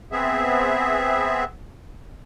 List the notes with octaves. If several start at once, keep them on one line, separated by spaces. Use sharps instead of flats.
B3 C4 G#4 E5